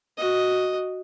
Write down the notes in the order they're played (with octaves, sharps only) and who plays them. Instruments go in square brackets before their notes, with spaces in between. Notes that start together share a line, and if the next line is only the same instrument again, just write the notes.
[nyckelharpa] F#4 D#5